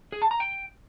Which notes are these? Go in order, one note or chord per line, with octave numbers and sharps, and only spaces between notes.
G#4
A5
A#5
G5